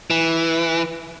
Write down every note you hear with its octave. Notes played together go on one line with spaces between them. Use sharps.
E3